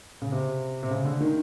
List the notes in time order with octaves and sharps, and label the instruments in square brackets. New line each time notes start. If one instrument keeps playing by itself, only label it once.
[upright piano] C#3
C3
C3
C#3
D3
D#3